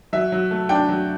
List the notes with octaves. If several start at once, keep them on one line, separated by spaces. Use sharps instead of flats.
F#3 E5
F#3
A3
D4 G5
F#3